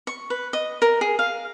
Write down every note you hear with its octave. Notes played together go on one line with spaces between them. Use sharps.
C#6
B4
D#5
A#4
G#4
F5